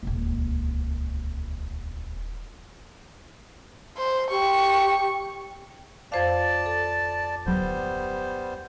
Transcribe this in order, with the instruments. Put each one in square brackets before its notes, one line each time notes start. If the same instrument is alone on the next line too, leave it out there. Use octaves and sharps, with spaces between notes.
[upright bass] D#1 C#2
[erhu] C5
[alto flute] G4 [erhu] C#6
[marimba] F2 C5 F5 [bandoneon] D5 A5
[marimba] A4
[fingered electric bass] D1 F#3 [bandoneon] G3 B3 C5